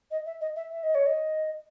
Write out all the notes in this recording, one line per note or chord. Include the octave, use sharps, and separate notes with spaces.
D#5
E5
D#5
E5
E5
D#5
C#5
D#5